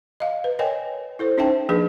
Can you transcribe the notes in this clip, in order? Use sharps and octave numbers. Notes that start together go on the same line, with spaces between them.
D#5 F5
B4
A#4 C#5 D#5 G5 G#5
E4 A4 C5
C#4 D#4 C5 E5 G5 A5
F3 A#3 D4 G#4 B4